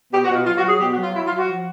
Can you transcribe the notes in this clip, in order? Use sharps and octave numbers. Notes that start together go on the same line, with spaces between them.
B2 G4
F#4
B2
F4
F#3 F4
F#4
F#3
G#4
B2 G4
F#4
F#3
F4
F#3 E4
F4
F#3
F#4
F3